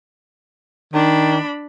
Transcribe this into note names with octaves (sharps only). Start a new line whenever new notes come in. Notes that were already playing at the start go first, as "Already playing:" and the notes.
D#3 D4 B5